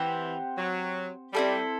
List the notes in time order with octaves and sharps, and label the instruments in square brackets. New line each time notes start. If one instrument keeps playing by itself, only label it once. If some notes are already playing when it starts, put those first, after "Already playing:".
Already playing: [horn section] E3 [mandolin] C4 G4 C5 F#5
[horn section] F#3
[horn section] G3 [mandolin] C4 E4 A4